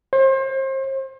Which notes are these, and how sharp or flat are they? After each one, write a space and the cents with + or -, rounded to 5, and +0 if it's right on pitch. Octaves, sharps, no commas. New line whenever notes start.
C5 +35